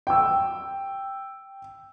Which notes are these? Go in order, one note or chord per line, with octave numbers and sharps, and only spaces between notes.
G5 E6